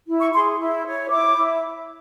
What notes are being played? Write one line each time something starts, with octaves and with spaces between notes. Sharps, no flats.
E4
C#6
G#4 C6
E4
C#5
E4 D6
E4